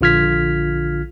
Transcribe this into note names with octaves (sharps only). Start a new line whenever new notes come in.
A#1 D3 F4 F6 G#6 B6